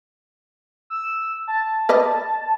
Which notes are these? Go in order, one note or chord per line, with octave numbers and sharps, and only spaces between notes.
E6
A5
B4 D5 D#5